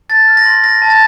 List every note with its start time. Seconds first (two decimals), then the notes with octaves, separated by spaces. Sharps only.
0.09 A5 A6
0.28 F6
0.37 A#6
0.45 C6
0.63 F6 A#6
0.82 A5
0.90 A6